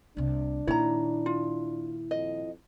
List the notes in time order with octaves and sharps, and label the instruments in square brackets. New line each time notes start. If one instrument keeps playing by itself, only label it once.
[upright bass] C2 C3 [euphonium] D4
[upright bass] A#2 D#3 [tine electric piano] E4 [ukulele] C#5 A#5
[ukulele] F4
[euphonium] F2 [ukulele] D#5